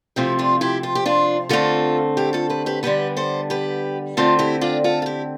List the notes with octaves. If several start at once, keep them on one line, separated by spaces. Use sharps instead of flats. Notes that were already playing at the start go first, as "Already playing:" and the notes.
C3 F3 A3 C4 E4 G4
D4 F4
E4 G4
F4
G4
D4 F4
D3 A3 C4 F4 A4
E4 G4
F4 A4
G4 B4
G4 B4
D3 G3 B3 G4 B4
A4 C5
G4 B4
D3 A3 C4 F4 A4
E4 G4
D4 F4
F4 A4
F4
E4 G4